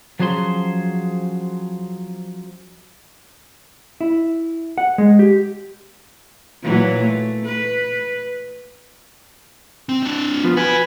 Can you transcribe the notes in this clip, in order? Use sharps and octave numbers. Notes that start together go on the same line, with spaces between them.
F3 F#3 C#4 G#4 C5 C6
E4
F#5
G#3
G4
A#2 E3 F#3
A3
B4
C4
C4 D4
F3 B3
F#4 B4 G#5 B5